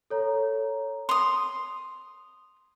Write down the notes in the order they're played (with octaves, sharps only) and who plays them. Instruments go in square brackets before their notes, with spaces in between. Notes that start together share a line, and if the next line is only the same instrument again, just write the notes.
[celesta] A4 C#5 A#5
[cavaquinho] C6 D#6 [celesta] F7